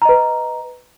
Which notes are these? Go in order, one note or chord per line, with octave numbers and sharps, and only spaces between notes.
B4 D#5 A#5